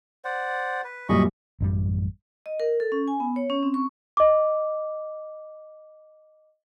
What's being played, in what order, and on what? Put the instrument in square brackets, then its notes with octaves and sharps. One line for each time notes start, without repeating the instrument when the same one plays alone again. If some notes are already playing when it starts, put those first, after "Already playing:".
[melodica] C5 D5 F#5
B4
[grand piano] F#2 A#2 G3 [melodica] D#5 B5 C#6
[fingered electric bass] A1 F#2 G3
[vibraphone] D#5
A#4
A4
C#4
G#5
B3
C#5
C#4
C4
C#6
[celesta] D#5 D6